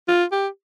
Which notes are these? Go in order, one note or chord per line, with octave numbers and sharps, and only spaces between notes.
F4
G4